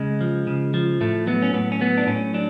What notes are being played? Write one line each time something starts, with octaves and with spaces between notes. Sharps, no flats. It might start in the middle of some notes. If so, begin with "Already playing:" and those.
Already playing: C#3 G#3
F3
C#3
F3
A2 A3
F#3 B3
C#4
A2 B3
C#4
F#3 B3
D4
A2 C#4
F#3 D4